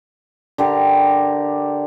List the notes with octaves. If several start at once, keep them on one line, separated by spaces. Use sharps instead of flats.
D3 G4 A#4